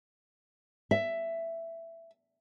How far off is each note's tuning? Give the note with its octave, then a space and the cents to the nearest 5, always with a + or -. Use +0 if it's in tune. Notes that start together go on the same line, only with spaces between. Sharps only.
E5 +10